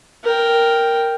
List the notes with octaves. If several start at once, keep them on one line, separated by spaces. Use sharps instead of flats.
A#4 G5